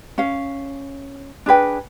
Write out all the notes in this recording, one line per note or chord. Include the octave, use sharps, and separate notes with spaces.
C#4 F5
D4 G#4 B4 G5